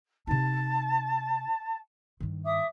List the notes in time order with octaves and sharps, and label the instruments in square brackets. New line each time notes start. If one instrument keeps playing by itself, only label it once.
[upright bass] C3 D#4 [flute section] A5
[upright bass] G2 D#3
[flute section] E5 D6 D#6